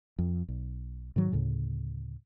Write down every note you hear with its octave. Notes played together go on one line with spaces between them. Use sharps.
F2
B1
G#2 D#3 F#3
D2 A2 C#3